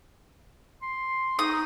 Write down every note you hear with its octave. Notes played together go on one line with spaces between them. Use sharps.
C6
D#4 D#6